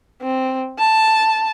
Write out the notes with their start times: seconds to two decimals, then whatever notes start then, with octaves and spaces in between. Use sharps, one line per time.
0.22 C4
0.78 A5